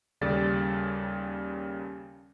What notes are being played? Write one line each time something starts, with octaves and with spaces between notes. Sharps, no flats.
D#2 C#3 G3 A4 D5 A6